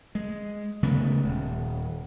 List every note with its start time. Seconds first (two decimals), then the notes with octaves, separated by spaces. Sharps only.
0.15 G#3
0.83 C#3 G#3 A3 B3
1.24 D#1